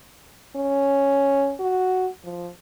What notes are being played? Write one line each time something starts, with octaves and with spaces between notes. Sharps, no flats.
C#4
F#4
F3